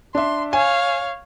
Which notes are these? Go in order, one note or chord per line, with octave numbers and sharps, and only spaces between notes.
D4 E5 C6
C#5 F5 G#5